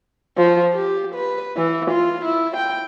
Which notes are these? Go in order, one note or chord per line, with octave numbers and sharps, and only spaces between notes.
F3
G4
B4
E3
F4
E4
G5